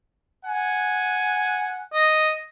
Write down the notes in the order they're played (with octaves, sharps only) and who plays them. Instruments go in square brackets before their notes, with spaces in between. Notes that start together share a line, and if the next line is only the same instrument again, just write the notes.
[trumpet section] F#5 G#5
[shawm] D#5